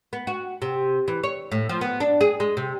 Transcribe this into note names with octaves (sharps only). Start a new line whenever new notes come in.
B3
F#4
C3
E3
C#5
A2
F3
B3
D4
G#4
G#3
C3